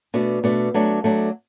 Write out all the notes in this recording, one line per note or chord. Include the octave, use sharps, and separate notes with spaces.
B2 A3 D4
B2 A3 D4
F#3 A3 D4
F#3 A3 D4